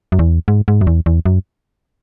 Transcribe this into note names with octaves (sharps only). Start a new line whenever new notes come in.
F#2
E2
G#2
G#2
F#2
E2
E2
F#2